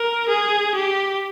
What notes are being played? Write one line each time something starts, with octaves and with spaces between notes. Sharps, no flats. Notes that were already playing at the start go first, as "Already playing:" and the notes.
Already playing: A#4
G#4
G4